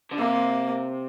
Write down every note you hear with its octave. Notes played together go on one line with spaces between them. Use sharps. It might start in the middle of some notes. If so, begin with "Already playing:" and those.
D3
C3 A#3